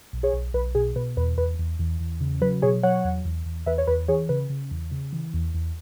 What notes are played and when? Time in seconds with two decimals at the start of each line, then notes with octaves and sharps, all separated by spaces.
0.13 B1
0.23 G#4 C#5
0.33 B1
0.54 B1 B4
0.75 B2 G#4
0.96 B2 B4
1.17 E2 B4
1.37 E2 B4
1.59 E2
1.79 E2
2.00 E2
2.21 C#3
2.41 F#3 B4
2.62 B2 G#4 C#5
2.83 F#3 C#5 F#5
3.05 E2
3.25 E2
3.46 E2
3.66 E2 B4 E5
3.78 C#5
3.87 E2 B4
4.08 E3 G#4 C#5
4.29 C#3 B4
4.50 C#3
4.71 E2
4.91 C#3
5.13 E3
5.34 E2
5.54 E2